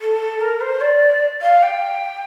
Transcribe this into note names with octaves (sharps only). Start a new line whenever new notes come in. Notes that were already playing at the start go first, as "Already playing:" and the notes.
A4
A#4
C5
D5
F5
G5